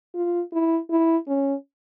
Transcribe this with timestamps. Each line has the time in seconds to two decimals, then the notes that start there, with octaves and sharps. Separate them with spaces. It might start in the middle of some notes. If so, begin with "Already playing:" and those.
0.15 F4
0.53 E4
0.91 E4
1.28 C#4